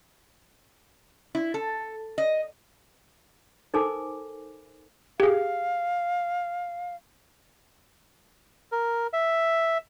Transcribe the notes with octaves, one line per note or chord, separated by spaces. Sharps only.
E4
A4
D#5
D#4 A4 A#4 C5 G#5 D6
G4 G#4 F5
A#4
E5